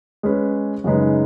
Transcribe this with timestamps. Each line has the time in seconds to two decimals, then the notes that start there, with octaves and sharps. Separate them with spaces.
0.23 G#3 C#4 B4
0.84 F#2 C#3 G#3 D#4 B4